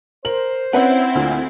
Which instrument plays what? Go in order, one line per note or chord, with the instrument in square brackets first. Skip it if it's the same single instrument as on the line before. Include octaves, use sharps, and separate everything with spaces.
[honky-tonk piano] A#4 F#7 [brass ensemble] C5
[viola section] C4 E4 [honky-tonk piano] C#4 B4 E5 [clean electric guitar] F#5
[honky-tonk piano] D2 F4 [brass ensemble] A#2